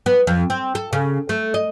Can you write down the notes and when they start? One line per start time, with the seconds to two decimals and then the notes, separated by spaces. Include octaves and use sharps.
0.06 B3
0.27 F2
0.50 C4
0.75 A4
0.93 C#3
1.29 A3
1.54 D#5